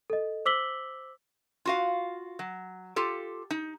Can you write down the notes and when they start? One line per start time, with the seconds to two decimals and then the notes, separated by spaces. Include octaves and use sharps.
0.10 A4 D#5
0.46 C5 D6 E6 B6 F#7 G7
1.65 F4 F#4 F5
2.39 F#3
2.96 F4 G4 A4
3.51 D#4